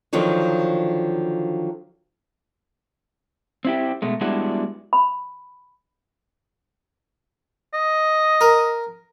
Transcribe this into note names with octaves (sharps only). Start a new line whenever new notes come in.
D3 D#3 F3 F#3 C5
C4 E4 G4
B2 G#3 A3
G3 G#3 B3 D4 E4 F#4
B5
D#5
A#4